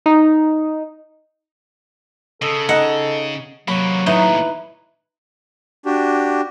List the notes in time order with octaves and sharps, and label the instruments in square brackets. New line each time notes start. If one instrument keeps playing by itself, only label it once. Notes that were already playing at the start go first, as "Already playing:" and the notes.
[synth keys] D#4
[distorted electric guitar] C#3 [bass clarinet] A4 [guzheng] D#5
[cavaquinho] D#4 D#5 [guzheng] F#5
[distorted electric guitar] C3 A#3 [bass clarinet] F#3 [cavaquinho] B5
[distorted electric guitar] D#2 A2 [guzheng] D#4 [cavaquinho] E4 B4
[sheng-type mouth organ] D4 F#4 G4